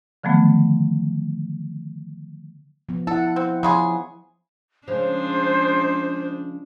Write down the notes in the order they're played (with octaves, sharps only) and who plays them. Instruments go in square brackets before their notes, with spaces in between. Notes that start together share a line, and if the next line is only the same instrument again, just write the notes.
[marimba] D3 D#3 F3 F#3 A3 B3
[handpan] F3 B3
[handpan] E4 F#5 [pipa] A4
[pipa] C4
[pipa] C#3 G#3 G#4 [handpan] F3
[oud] C#3 F3 C#4 [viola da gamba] G#3 D4 [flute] C5